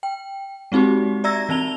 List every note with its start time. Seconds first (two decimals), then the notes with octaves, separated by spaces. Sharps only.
0.03 G5
0.72 G#3 C4 D#4 F#4 G4
1.24 D5 E5 A#5 E6 G#6 A#6
1.49 E3 C4 A5 F7 G7